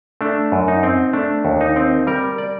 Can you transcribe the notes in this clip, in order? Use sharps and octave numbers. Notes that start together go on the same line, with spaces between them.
A3 D4
F#2
D#4
C4
A3 D4
D#2
D#4
C4
G3 A#4
D5